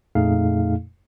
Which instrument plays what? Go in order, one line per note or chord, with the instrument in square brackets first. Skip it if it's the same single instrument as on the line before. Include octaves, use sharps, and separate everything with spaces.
[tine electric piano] F2 A#2 A3 D#4 G#4 F5